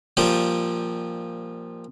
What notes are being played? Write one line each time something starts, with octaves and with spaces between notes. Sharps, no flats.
A#2 F3 G3